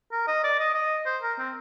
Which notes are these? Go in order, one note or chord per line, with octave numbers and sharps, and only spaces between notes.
A#4
D#5
D5
D#5
D#5
C5
A#4
C4